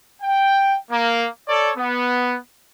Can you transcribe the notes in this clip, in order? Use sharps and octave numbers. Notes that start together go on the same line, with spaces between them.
G5
A#3
A4 C#5 D5
B3